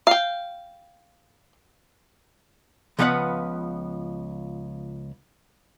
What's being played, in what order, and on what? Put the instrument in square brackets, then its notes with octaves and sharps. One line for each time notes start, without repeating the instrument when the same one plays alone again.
[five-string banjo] F5 G5
[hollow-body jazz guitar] C#2 F3 B3 B4 D5 F#5